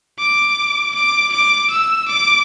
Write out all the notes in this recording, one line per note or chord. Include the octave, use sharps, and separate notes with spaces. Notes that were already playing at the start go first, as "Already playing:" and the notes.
D6
D6
D6
E6
D6